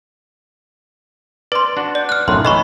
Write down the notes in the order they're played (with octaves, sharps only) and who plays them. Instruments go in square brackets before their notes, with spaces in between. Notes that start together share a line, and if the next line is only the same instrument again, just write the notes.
[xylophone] B4 C6 [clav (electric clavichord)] D5
[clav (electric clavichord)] D4 F#4
[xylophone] D5
F6 F#6
[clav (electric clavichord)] B1 F#2 A2 [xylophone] C6
[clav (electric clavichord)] E3 [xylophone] D#5 B5 C#6